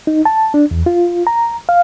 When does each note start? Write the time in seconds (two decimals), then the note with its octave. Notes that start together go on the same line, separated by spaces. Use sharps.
0.07 D#4
0.25 A5
0.54 D4
0.71 E2
0.86 F4
1.27 A#5
1.69 F5